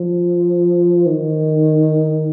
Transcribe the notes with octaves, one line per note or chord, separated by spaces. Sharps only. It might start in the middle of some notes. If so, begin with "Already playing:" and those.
Already playing: F3
D#3